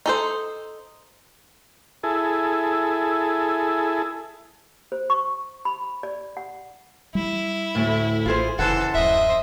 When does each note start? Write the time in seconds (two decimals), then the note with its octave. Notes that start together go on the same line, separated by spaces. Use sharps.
0.06 D#4 A4 C5
2.03 E4 G#4 A4
4.92 C5
5.10 C#6
5.65 B5
6.03 D5
6.37 F#5
7.15 G3 E4
7.75 D2 A2
8.26 A1 F4 G#4 C5
8.59 F1 C#3 E3 A4 C5 F#5
8.94 D1 F#2 C5 D#5 E5